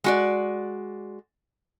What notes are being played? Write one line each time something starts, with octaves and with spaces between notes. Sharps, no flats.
G#3 F#4 D5